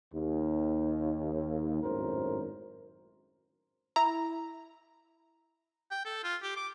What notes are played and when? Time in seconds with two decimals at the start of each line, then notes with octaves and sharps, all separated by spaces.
0.13 D#2
1.83 G#1 F#2 A2 A#4 C5
3.96 E4 A#5
5.91 G5
6.05 A4
6.24 F4
6.42 G4
6.57 D6